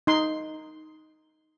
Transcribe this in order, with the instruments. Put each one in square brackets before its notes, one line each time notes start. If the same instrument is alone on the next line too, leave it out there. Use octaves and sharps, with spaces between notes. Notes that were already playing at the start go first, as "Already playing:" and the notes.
[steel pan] D#4 C6